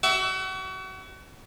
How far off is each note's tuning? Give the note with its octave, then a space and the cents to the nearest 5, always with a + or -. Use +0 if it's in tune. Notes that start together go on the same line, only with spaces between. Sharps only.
F#4 +35 E5 +0